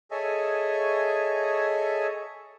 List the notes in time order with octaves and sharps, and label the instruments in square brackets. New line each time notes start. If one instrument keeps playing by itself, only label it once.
[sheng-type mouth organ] G#4 A4 C#5 D#5 E5 G#5